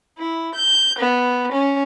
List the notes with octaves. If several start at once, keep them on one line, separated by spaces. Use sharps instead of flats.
E4
G6
B3
C#4